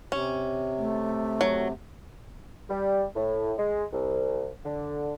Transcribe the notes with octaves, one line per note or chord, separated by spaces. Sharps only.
C3 C#4
A3
F#3
G3
A2
G#3
C2
D3